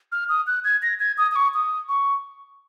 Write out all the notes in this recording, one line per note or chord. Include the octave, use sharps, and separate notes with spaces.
F6
D#6
F#6
G#6
A#6
G#6
D#6
D#6
C#6
D#6
C#6